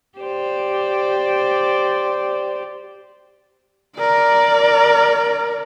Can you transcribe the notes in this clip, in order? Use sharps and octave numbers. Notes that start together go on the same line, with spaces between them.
G4 C5 D5
A#4 D5